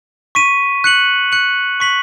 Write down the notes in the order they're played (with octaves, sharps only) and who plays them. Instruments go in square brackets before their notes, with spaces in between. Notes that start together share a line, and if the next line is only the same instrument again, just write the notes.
[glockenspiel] C#6 B6 D#7
F#6 C#7 F#7
F#6 C#7 F#7
C#6 B6 F#7